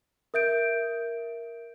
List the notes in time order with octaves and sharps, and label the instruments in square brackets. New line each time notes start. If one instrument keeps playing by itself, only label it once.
[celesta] A#4 E5 G6 D7